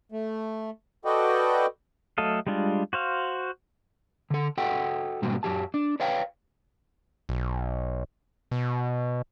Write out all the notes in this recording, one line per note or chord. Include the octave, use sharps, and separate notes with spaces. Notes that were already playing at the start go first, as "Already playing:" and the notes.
A3
F#4 A4 B4 D5 D#5 G5
F#3 A3 A4 D#5 F5
G3 G#3 D4 F4
F#4 C5 F5
D3 A4
F#4 A4 D#5 F#5 G5
G#2 B2 G3 A#3 F#4
F#2 F#3 G4 A5
D4
B4 C#5 D5 F5 G5
B1
B2